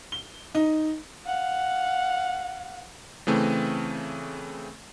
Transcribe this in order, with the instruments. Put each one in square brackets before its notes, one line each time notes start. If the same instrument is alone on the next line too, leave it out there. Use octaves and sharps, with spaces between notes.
[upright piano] G7
D#4
[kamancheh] F5 F#5
[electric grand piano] C#3 E3 A3 C4